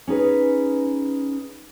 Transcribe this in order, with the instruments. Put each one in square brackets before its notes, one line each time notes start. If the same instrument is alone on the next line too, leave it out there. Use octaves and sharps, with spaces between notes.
[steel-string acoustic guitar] C#4 D#4 G#4 B4